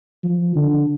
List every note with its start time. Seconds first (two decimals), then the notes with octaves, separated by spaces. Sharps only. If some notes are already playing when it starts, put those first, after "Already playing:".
0.24 F3
0.55 D3